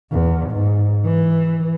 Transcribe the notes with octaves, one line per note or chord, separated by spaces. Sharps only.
E2
G#2
E3